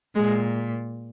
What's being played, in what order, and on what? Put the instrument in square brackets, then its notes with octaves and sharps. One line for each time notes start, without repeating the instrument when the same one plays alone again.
[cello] A#2 [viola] G#3